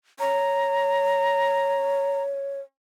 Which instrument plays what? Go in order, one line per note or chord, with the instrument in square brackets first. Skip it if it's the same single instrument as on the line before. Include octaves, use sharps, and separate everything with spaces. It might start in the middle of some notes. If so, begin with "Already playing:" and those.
[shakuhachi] C#5 [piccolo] A#5